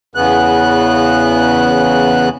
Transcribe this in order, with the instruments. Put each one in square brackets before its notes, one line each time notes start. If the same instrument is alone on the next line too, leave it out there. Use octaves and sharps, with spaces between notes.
[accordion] E2 C#3 B3 F#6